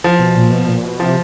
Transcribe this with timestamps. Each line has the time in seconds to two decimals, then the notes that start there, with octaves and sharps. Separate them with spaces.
0.04 F3
0.20 B2
0.36 A#2
0.51 B2
0.68 A#2
0.83 B2
1.00 C3 F3